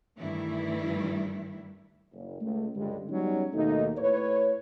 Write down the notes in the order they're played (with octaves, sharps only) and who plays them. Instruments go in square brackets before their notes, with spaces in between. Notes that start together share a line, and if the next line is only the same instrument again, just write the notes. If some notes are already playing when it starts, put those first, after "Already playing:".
[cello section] G2 D#3 E3 G3 A3 E4
[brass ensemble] F#1
C#2 A3
C#2 G2 D3 G3 G#3
F#3 G3 B3 C#4 D#4
D#2 B2 A3 D#4
A2 B4 C#5